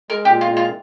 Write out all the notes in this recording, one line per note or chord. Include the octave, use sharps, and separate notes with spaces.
G#3 A#4
G4
A#2
F4
G#3
F4